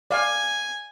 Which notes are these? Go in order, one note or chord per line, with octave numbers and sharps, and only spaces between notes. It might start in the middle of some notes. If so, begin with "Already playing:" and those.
D5 F5 G#5